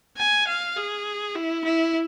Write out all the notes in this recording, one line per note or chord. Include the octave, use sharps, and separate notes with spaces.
G#5
F5
G#4
E4
E4